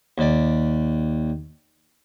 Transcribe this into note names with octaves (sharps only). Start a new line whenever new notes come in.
D#2 D5